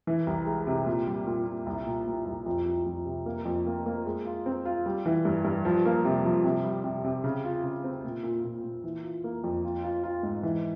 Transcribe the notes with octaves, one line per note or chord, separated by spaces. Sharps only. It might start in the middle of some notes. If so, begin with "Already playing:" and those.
E3
C2
G#3
C3
A#2
G3
A#2
A#2
C2
A#2
A#2
C2
F2
F2
F2
C3
A#3
F2
A#3
A#3
G#3
F4
C4
F4
G3
E3
G2
G2
F3
A#3
C3
F3
C3
G3
C3
C3
C#3
F4
C#3
C4
A#2
A#2
A#2
A#2
E3
F4
A#3
F2
F4
F4
F4
G#2
E3